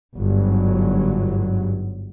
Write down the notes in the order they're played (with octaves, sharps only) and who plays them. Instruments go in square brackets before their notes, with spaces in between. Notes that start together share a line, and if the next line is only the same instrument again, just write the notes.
[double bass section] G1 G#2 F#3